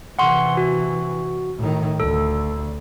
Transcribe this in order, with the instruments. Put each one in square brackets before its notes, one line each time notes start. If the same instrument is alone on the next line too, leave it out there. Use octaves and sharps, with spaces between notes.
[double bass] C3 E3 [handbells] F#5 C6 C#6
[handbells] F#4
[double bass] A2 D#3
[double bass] D2 [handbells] A4